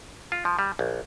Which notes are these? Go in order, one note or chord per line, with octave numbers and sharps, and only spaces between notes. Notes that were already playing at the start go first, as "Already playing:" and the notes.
F4
F3
G3
A#1